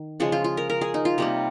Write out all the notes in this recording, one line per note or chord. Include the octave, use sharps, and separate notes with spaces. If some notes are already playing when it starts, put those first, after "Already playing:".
Already playing: D#3
C#3 F3 G#3 G#4
F4
F4
A#4
A#4
G#4
D#4
F4
C3 G3 A#3 A#4